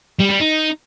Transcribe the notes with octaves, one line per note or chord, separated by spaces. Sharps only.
G3
G3
D#4